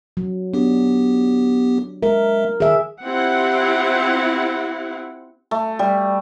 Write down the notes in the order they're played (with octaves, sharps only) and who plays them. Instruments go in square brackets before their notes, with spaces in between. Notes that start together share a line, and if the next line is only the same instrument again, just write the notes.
[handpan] F#3
[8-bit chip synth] B3 G4 [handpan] D4
[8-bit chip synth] G#3 E5 [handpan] A#4
[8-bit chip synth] D#3 [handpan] G#4 E5
[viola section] C4 E4 F4 G4 F#5
[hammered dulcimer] A3
G3